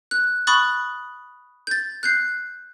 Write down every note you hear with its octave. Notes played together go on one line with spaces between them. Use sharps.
F#6
B5 C#6 D#6 F#6 A6
G6 A6
F#6 G6 C7